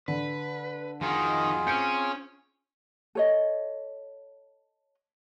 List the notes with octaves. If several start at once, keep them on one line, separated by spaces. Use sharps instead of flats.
D3 B4
F2 D#3 D#4 F4 F#4 G#4
C4 C#4 G6 C#7 D7
A4 C#5 D#5